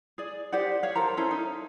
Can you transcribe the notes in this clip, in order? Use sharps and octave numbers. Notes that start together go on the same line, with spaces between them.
G#4 D5
G4 C5 D5 F#5
C#5 F5
A4 A#4 C5 A#5
C#4 E4 A4 C5
D#4